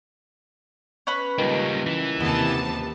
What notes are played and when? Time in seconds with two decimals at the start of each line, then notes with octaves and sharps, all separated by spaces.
1.07 C#4 B4
1.38 C#2 D#3 G3 A#3
1.86 E3
2.20 D#2 C3 B3 A5